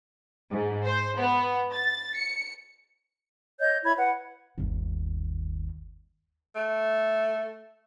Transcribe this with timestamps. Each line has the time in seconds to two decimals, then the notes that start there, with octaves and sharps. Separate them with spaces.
0.51 G#2
0.86 C5
1.18 B3
1.73 A6
2.17 C#7
3.60 C#5 D#5 G6
3.84 E4 C#5 B5 G#6
3.96 B4 F#5
4.58 G1 D#2
6.55 A3